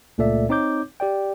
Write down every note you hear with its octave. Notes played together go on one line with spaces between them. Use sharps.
C#2 A#2 A3 A4 D5 E5
C4 D#4 C#5 D6 G6
G4 D5 G5